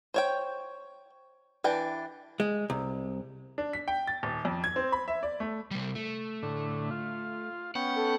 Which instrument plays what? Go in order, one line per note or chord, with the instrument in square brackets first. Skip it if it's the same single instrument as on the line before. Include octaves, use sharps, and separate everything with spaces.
[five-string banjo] C5 C#5 G5
E3 D4 G5
[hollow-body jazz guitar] G#3
C2
[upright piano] D4
B6
G5
A6
D#1
F2
G#6
C4
B5
E5
D5
A3
[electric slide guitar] C3 G3
A3
[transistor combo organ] A2 D3
F4
[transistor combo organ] B3 C#4 G5 [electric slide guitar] F#5
[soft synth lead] A4